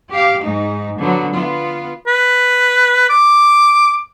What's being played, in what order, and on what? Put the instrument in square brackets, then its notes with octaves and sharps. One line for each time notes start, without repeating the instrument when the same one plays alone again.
[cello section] G4 F5
G#2 D#4
D3 F3 F#3 B3
B3 F4
[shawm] B4
D6